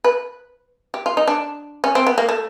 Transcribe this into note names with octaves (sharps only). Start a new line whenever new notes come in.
B4
G4
F4
D#4
D4
C#4
C4
B3
A#3
A3